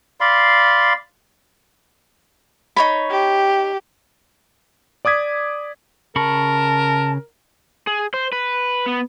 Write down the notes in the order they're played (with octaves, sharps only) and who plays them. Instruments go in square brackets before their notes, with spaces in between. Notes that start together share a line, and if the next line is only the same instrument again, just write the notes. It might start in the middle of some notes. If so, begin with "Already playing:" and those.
[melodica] D5 F5 B5 C6
[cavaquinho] D#4 C#5 B5
[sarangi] G4
[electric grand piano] D5 D6 D#6 G#6 B6
[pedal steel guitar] C#3 B5 C#6 [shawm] A#4 [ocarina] A5
[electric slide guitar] G#4
C5
B4
B3